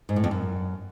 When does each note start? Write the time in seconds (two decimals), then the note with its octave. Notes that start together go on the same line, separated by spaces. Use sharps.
0.09 G#2
0.16 A2
0.24 F2
0.31 F#2